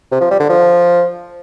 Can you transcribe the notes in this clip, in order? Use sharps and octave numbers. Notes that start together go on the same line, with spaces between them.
C3
F3
G3
D3
F3